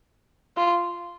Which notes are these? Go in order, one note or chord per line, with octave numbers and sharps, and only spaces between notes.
F4